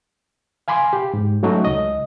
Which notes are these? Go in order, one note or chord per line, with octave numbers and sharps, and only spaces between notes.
F5 G#5 B5 C6 D6
G4
G#2
F#3 A3 C#4 D#4 F#4
C#2 D#5